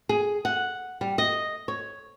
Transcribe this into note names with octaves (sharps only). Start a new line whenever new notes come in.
G#4
F#5
G3
D#5
C#5